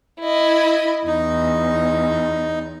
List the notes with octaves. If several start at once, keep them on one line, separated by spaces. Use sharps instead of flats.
E4 D#5
E2 D#4